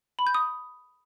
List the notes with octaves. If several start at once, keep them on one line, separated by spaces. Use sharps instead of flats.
B5
G6
D#6